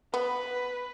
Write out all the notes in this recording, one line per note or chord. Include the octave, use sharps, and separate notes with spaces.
B3 B4